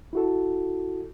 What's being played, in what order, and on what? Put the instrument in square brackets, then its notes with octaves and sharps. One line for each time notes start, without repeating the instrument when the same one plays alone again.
[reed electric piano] E4 F#4 A4